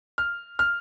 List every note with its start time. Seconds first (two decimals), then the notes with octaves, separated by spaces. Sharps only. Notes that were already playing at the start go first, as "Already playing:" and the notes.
0.18 F6
0.59 F6